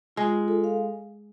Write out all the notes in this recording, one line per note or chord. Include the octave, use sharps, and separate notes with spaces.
G#3 F4
F4
A4
F5